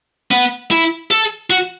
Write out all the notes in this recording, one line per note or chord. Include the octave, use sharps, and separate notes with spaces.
B3
E4
A4
F#4